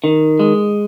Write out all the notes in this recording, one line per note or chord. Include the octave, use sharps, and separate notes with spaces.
D#3
G#3